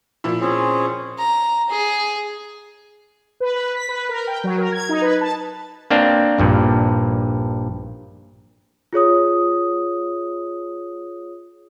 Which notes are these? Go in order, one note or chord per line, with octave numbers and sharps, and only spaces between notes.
A#2 F3 E4
C4 C#4 G#4
A#5
G#4
B4
B4
B6
B4
A#4
G5
F#3
A#4
G#6
D#4
B4
A5
A#3 C4 D4 F5
A#1 G2 A#2
F4 G#4 C#5 D#6